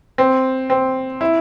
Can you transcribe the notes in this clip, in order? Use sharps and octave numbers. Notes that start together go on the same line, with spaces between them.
C4
C4
E4